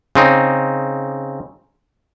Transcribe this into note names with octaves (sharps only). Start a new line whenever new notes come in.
C#3 C4 D#4